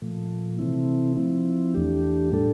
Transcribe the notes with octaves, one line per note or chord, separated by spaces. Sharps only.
A#2 F3 A3
C3 E3 A3 C4 E4
F3 C4 E4
E2 E3 A3 D4 G4
A2 G3 D4 A4